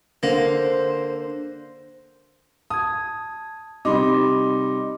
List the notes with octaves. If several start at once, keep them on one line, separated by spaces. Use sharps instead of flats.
D3 A#3 C5
A5 D#6 G#6
C3 G3 D#4 B5 C6 D6